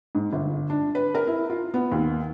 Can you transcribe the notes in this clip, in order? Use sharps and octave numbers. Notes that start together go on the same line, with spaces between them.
G#2
G1
D4
B4
A#4
E4
F4
B3
D#2